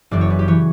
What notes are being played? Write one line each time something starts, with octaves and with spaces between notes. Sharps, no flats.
F#1 F#2 E3 D5
C#5
B4
G4
E3 C#5